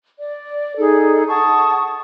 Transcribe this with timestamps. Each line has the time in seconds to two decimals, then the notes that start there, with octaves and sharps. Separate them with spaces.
0.19 D5
0.77 D#4 G#4 A4
1.29 F#5 A5 C#6 D#6